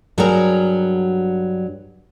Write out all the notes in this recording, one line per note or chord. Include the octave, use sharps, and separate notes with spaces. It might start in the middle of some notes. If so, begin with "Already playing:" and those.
G2 F#3 D4 F#4 G#4 A#4